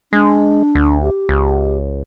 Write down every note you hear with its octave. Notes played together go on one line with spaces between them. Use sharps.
G#3 D4
D2
G4
C#2